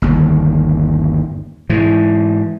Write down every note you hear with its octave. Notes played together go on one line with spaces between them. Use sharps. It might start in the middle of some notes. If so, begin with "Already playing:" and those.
G1 D#2
G#2 E3